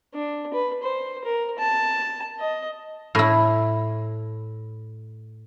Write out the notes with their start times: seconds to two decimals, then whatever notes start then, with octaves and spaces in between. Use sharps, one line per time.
0.14 D4
0.54 B4
0.84 C5
1.25 A#4
1.58 A5
2.39 D#5
3.15 A2 E4